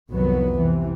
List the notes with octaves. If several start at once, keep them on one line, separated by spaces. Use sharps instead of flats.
C2 F2 D#3 F#3 B3
C3 E3